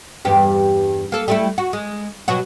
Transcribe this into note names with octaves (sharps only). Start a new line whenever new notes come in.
E2 G2 G4
A#3 A4
G3 A3 E4
F#4
G#3
B2 F#3 F#4